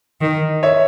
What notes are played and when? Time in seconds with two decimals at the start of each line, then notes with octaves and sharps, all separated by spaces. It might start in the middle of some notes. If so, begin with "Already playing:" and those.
0.21 D#3
0.63 C#5 E5